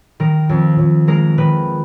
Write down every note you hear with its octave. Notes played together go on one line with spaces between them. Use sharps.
D#3 A#4
F2
F2
G#3 A#4
D#3 B4